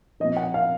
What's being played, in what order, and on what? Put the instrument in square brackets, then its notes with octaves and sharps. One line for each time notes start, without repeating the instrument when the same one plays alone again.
[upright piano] F3 D#5
A#2
F#5
F5